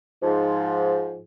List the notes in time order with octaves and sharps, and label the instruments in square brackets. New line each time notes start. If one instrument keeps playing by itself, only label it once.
[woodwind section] G#2 F3